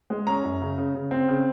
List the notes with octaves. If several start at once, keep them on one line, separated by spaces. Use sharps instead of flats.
G#3
C#4 A#5
F#2
C#3
C#3
C#3
C4
C#3